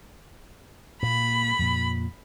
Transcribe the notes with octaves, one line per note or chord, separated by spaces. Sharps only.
A#2 A#3 B5
F2 A#2